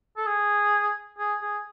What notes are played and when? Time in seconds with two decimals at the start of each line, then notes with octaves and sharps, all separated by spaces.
0.17 A4
0.27 G#4
1.19 G#4
1.42 G#4